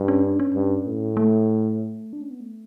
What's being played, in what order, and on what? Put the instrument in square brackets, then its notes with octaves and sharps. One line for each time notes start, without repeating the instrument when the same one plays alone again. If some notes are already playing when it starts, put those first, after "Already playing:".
Already playing: [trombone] G2
[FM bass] C#4
D4
C#4
[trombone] G2
A2
[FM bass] A3
D4
C#4
B3
A3